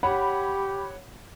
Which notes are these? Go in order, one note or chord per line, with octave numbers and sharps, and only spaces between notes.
G4 C#5 F#5 B5